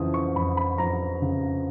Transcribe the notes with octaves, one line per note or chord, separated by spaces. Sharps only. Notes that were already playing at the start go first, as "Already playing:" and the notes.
Already playing: F2 C#3 E3 D#6
C#6
F2 B5
B5
F2 A#5
C#3